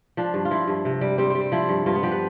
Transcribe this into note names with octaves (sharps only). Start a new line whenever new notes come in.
F3 D4
G2
F4
F3 E4
G2
C3
G3
G3 C4
G3 C4
C4
F3 E4
G2
G2 F4
B3
F3 G4
B4